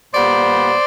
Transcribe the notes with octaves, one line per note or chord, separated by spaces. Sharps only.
A#2 G3 B3 C5 D5